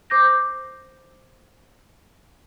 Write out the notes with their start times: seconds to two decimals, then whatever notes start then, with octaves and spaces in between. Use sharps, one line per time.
0.10 C5 D6 G6 A#6